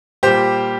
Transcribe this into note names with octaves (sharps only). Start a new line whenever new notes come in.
A#2 G3 G4 C5